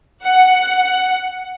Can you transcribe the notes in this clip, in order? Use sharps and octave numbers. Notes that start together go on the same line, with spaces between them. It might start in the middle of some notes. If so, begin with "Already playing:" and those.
F#5